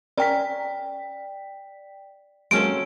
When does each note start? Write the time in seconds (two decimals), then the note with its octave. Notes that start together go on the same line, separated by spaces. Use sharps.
0.18 C#4 A#4 D5 G5 B6
2.51 F#3 G#3 A#3 C4 C#4 A4 D7